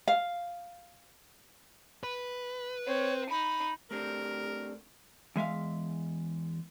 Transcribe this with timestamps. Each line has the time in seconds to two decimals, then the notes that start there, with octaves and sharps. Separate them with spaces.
0.08 F5
2.03 B4
2.86 C4 C#5
3.30 D#4 B5
3.91 A3 C4 D4 G4 A#4
5.36 E2 G#3 E5 F5